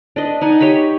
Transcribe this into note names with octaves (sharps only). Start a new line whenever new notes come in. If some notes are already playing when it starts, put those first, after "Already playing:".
D4 B4 D#5
D#4 F#5 G#5
G4 C#5 D#5 B5